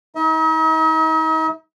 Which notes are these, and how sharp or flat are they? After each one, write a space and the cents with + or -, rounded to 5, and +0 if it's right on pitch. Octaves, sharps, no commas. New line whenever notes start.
D#4 +40 D#5 +45